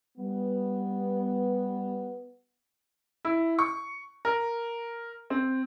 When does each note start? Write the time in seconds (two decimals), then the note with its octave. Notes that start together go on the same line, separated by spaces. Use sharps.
0.18 G3 B3
3.25 E4
3.59 C#6
4.25 A#4
5.30 C4